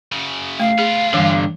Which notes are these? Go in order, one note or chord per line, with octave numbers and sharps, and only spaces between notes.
F#2 C#3
A3 F5
B3 F4 G#4
G2 D3 E3